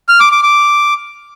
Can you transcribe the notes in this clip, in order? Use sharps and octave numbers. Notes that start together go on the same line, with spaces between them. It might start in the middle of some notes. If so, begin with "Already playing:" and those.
F6
D6
D6
D6